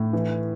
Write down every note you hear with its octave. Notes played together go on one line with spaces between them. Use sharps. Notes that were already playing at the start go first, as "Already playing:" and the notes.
Already playing: A2
E3